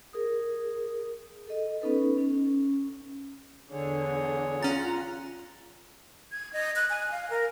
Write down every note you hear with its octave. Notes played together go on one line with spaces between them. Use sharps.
G#4 A#4 D#6
A4 D#5
B3 C#4 D#4 A4 B4
C#4
E2 D3 G#4 C#5
C#4 F4 F#5 A#5 A6
G#6
D#5
F#6
G#5
F5
A#4